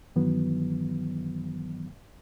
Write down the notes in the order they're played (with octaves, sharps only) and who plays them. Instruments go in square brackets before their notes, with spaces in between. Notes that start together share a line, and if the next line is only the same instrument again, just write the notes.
[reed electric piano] G2 D#3 E3 F#3 B3